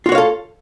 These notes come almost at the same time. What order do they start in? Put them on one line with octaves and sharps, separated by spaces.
F4 F#4 C#5 F5 A4